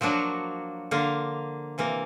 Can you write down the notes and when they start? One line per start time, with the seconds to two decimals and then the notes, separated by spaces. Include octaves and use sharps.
0.01 F3 F#3 A#3 D4 F#4
0.91 D3 A#3 F4
1.78 C3 E3 A#3